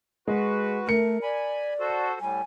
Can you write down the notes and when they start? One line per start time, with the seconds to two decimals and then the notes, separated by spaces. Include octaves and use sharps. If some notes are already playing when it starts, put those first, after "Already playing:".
0.28 G#3 F#4 B4
0.87 A3 A#4 C#7
1.23 D5 G#5 B5
1.80 F#4 A4 C5
2.21 A2 G3 G#5